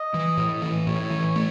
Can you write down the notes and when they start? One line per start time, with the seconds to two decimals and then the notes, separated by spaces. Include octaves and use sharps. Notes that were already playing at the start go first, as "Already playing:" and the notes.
Already playing: D#5
0.14 E3
0.37 A2
0.62 E3
0.87 A2 C#5
1.10 E3
1.36 A3